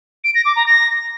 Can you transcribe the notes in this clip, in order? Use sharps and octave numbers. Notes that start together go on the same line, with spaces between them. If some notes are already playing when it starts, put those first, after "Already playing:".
D7
A#6
D6
A#5
A#6